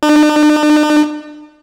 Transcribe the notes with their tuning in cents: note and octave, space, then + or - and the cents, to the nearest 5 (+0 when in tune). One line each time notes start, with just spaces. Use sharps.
D4 +45